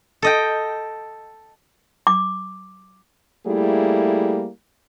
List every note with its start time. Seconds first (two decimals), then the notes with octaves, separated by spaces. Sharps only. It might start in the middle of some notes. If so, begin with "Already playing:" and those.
0.22 A4 D#5 G5
2.07 D6
3.46 G3 A3 A#3 E4 G#4